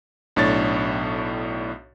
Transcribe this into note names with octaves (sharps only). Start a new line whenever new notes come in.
B1 A2 D4 C#5 A6